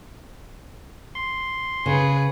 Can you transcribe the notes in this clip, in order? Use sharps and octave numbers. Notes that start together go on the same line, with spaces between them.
C6
C#3 G#4 B4